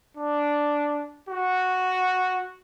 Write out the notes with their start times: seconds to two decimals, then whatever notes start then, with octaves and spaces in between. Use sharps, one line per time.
0.17 D4
1.29 F#4